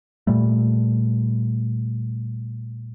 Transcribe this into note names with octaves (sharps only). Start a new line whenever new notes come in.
A#2 G3 A3